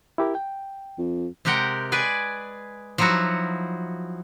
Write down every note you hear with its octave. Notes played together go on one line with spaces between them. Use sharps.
E4 G4 A#4
G5
F2
C3 G#3 G4 A#4 F#5 G5
G#4 B4 D5 G#5
F3 F#3 D#4 E4 F#4